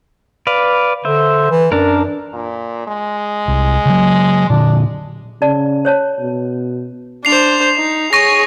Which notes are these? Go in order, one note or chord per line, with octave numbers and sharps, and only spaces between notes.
B4 D5 F5
D3 C5 E5
E3
F#2 D4 A#4
A#2
G#3
C2
C#3 F#3
A#2 D3 D4
C#3 D5 A5
C5 C#5 A5
B2
D4 C5 C7 F7
D#4
G#4 C#5 C#6 A#6